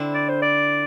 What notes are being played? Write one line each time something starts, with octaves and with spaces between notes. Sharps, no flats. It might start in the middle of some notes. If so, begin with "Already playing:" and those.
Already playing: D3 C4 E4
D5
C5
D5